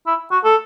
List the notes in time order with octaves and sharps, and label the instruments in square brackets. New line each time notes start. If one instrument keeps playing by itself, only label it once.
[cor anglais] E4
F#4
A4